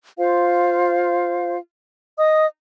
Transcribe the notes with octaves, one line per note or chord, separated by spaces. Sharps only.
F4 C5 F5
D#5 D#6